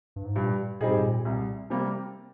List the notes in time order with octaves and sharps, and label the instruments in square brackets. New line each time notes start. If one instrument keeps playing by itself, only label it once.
[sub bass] G2
G#2
[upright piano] G2 [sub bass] A#2
[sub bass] A#2 [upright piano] G3 C4 D#4 G#4
[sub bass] G#2
A#2
[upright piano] C2
C3 G3 A#3